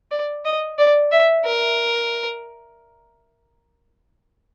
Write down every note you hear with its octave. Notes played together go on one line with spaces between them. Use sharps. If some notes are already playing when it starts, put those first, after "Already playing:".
D5
D#5
D5
E5
A#4